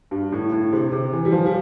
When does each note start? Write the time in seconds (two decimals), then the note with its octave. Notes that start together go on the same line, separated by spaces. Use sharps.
0.11 G2
0.32 A2
0.52 A2
0.73 C3
0.92 C3
1.13 E3
1.25 G3
1.32 F3
1.46 G3